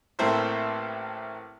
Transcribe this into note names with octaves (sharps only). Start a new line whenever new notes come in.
A1 A3 A#3 C4 E4 C5